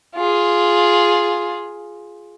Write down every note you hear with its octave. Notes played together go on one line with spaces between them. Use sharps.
F4 G#4